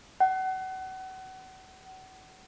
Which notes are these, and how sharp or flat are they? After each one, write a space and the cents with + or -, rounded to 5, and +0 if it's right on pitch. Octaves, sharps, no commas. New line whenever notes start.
F#5 +30